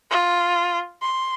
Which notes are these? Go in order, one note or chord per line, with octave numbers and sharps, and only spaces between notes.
F4
C6